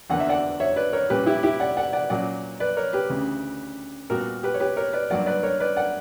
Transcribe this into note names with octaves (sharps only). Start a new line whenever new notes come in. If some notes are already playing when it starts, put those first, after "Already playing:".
E2 D3 A#3 D4 F#5
E5
D5 F#5
C#5 E5
B4 D5
A#4 C#5
A#2 G3 C#4 G4 B4
E4 G4
E4 G4
D5 F#5
D5 F#5
D5 F#5
A#2 F#3 C#4 D5 F#5
B4 D5
A#4 C#5
G4 B4
D2 C#3 E3
A#2 G3 B3 F#4 A#4
G4 B4
C#5
G4 B4
A#4 C#5
B4 D5
G2 F#3 A#3 D5 F#5
B4 D5
A#4 C#5
B4 D5
D5 F#5